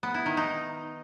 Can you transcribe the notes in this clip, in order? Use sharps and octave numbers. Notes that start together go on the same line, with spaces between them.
B3
E4
D#3
D#4